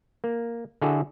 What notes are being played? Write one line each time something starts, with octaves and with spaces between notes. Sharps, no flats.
A#3
D3 E4 F#4 G#4 A4